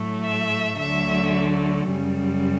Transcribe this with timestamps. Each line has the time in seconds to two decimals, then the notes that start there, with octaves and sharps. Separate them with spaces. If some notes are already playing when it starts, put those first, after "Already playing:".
Already playing: A2 F#3 A3
0.24 E5
0.79 D2 D3 F#3 A3 E5
1.91 F#2 C#3 G3